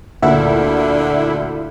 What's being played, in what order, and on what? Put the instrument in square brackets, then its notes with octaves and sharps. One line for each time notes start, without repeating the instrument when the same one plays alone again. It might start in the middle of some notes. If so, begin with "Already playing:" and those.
[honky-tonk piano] D2 A#2 [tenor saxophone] D3 [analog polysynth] E4 [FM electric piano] E5 F#5